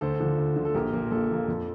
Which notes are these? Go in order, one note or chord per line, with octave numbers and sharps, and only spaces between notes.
D2 A4 C5
D3 F3
D2
D3 F3
A4
A#1 G4 A#4
A#2 F3 A#3
A#1 A4
A#2 F3 A#3
F2